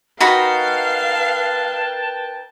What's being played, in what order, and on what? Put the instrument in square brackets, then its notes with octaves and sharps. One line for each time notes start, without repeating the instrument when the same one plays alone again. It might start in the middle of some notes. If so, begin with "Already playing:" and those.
[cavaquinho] D#4 F#4 B5 [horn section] A#4 G5 A5 [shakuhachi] B4 [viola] F5